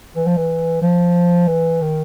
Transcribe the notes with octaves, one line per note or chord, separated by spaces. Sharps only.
E3
F3
E3
F3
E3
D#3